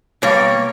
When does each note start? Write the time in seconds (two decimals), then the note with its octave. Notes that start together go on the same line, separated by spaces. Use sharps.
0.22 B2 G3 A#3 C#5